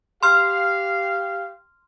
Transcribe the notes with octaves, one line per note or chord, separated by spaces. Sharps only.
G4 F5 C6 F6